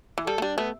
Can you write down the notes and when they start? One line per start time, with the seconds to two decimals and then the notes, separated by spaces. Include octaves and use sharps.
0.18 E3
0.27 G3 A4
0.38 A3
0.42 G3 D4
0.58 A3 B3